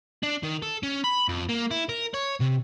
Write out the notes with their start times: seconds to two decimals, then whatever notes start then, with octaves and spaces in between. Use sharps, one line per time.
0.23 D4
0.43 D#3
0.62 A4
0.83 C#4
1.04 B5
1.28 F2
1.49 A#3
1.71 E4
1.89 A#4
2.14 C#5
2.40 C3